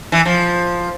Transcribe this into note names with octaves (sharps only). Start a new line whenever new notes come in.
E3
F3